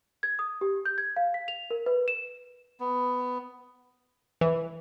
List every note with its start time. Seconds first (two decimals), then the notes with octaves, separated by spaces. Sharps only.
0.23 G#6
0.39 D#6
0.61 G4
0.86 G6
0.98 G#6
1.16 F5
1.34 B6
1.48 F7
1.71 A#4
1.86 B4
2.08 E7
2.80 B3
4.41 E3